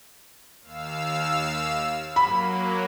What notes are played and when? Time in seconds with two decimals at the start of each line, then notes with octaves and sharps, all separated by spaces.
0.62 D#2 F5 E6
2.16 F#3 A#3 B5